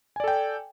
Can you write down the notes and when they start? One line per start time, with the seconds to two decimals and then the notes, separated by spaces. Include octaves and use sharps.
0.16 G#5
0.20 D5
0.24 A4
0.28 G5